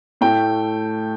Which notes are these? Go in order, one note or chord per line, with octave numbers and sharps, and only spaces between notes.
A2 A3 G5